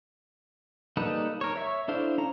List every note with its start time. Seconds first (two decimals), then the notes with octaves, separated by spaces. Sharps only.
0.97 G3 A#3 D#4 A4 B4
1.41 A#4 C#5
1.56 C#5 E5 C#6
1.88 D4 E4 A4 C5 F5
2.18 C#4 A#5